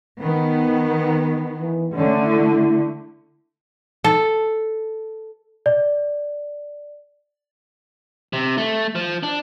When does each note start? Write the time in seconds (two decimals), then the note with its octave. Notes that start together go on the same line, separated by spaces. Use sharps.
0.21 D#3 B3
1.58 E3
1.95 D3 A3 C#4
2.26 E4
4.04 A4
5.66 D5
8.33 C3
8.58 A3
8.95 F3
9.23 D4